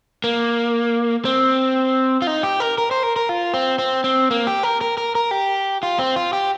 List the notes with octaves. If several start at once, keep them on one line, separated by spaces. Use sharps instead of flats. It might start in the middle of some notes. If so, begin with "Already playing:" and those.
A#3
C4
F4
D#4
G4
A#4
A#4
C5
A#4
A#4
F4
C4
C4
C4
A#3
G4
A#4
A#4
A#4
A#4
G4
F4
C4
F4
G4